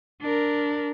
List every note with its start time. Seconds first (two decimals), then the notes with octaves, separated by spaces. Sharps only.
0.21 D4 A#4